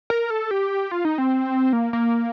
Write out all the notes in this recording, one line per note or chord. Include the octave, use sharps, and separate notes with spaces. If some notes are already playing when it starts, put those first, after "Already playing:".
A#4
A4
G4
F4
D#4
C4
A#3
A#3